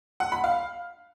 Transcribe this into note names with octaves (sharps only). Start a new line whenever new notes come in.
F#5
B5
F5